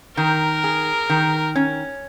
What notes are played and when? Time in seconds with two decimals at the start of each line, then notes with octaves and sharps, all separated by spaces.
0.17 D#3 A#4
0.64 G#4
1.10 D#3
1.56 C#4